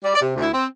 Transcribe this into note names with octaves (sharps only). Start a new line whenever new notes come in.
G3 D5
D5
C3
D2
E4
C4